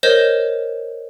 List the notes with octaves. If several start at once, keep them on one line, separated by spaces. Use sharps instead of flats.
A#4 C5 C#5 D#5 G6 E7